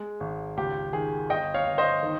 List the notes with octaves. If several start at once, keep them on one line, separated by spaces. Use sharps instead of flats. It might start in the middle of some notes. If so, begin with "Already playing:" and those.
Already playing: G#3
G#1
C#2 G4
D#3 G#4
G1 D#5 G5
C#5 F5
G1
C5 D#5
D#3